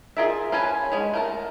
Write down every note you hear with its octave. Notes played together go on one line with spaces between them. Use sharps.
F4 G#4 A#4 D5 E5
C#4 F4 B4 G#5 A5
G#3 G#4 C#5
A3 A#4 A5